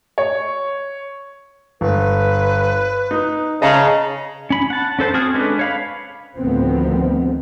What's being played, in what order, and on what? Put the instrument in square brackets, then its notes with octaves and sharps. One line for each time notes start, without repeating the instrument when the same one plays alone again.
[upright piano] C#5
[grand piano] G1 [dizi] B4
[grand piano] D#4
[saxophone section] C#3 [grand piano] D#5 A5 A#5
[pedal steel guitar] C#4 B5
F#5 A5
C#4 A4 C5 A5
C4 F#4 G#4 F6
G#3 C#4 D4 A4 B4
C#5 F5 B5
[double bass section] D2 A2 D#3 F3 B3 C4